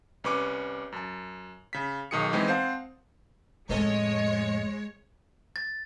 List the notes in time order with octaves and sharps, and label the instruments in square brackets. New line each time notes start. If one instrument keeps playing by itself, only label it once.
[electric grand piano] C2 C#4 B4 C#6 D6
F#2 A5
C#3 B6
B1 D#3 G#4 D#6 C#7
E3 G#3 B3 C4 D#4
C4 C5 F5 F#5 A5
[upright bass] F2 A2 [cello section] G#3 [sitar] C#4 A4 D#5 [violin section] C#5
[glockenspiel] A6